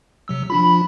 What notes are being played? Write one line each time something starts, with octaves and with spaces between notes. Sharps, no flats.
C3 F#3 E6
F3 D4 F4 B5